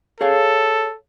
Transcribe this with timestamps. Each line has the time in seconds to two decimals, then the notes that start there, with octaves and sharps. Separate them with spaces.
0.21 G#4 A4 C#5 F5